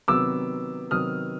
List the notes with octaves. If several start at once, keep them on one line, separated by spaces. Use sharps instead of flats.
C3 D#3 F#3 B3 D6 E6
C3 D#3 F#3 B3 D#6 F6